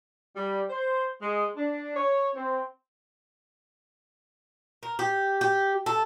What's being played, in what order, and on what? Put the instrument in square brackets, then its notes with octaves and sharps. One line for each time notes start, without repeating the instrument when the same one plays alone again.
[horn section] G3
C5
G#3
D4
C#5
C4
[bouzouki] A#4
G4
G4
A4